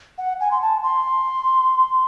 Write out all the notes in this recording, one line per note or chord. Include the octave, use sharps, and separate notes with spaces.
F#5
G#5
C6
A5
C6